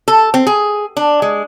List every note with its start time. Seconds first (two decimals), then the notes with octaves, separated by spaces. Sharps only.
0.08 A4
0.34 C4
0.47 G#4
0.97 D4
1.22 G#3